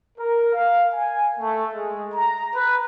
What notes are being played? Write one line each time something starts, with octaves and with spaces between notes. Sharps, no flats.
A#4
F5
G#5
A3
G#3
A#5
B4